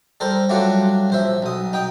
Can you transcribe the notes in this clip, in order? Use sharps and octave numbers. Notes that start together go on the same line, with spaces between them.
G3 A4 A#4 C5
F#3 G3 A3 D4 F4 D5
A#1 C5 E5
B1 D#6
D#4 G5 D#6